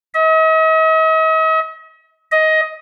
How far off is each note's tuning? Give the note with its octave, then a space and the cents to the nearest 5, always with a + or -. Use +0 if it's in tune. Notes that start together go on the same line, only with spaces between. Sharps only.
D#5 +45
D#5 +15